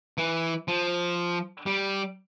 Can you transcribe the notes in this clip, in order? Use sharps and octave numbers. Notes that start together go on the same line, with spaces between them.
E3
F3
G3